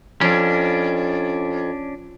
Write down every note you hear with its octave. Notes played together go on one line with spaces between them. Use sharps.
F2 C#4 D4